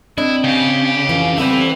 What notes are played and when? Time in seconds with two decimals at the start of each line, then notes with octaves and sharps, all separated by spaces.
0.18 C4 D4 E4 D#5
0.44 C#3 G4
1.09 F2 E3
1.38 G3 B3 C4 A4 B4 E5